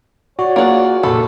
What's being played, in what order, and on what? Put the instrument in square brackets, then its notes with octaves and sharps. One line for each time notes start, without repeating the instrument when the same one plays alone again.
[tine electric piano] F#4 [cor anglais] C#5 [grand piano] D5
[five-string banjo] A#3 D5 [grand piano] F4 G#4 F#5
[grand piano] F1 A#2 B5 [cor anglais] A3 [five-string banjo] A4